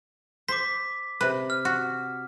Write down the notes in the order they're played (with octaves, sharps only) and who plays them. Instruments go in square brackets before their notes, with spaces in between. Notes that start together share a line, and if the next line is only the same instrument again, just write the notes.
[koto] C5 [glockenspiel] D6 B6
[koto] C3 B4
[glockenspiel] F6
[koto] F#4